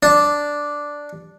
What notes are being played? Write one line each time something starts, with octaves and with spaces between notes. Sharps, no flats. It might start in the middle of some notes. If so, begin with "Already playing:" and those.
D4